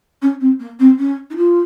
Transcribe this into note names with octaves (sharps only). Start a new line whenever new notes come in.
C#4
C4
A#3
C4
C#4
D#4
F4